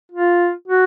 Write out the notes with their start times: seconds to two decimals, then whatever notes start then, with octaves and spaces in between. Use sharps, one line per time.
0.12 F4
0.67 F#4